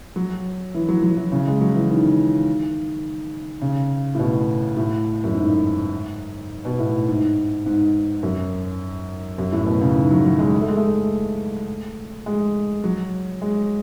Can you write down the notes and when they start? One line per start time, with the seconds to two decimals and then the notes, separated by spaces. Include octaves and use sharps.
0.16 F#3
0.74 E3
0.89 F#3
1.03 F#3
1.17 E3
1.32 C#3
1.48 G#3
1.61 F#3
1.75 E3
1.90 D#3
3.61 C#3
4.15 A2
4.19 B2
4.77 A2
5.24 F#2
5.34 G#2
6.65 B2
6.79 A2
7.08 G#2
7.66 G#2
8.23 F#2
9.38 F#2
9.52 A2
9.66 B2
9.81 C#3
9.96 D#3
10.11 F#3
10.25 F#3
10.39 G#3
10.61 A3
10.68 G#3
10.76 A3
12.26 G#3
12.84 F#3
13.42 G#3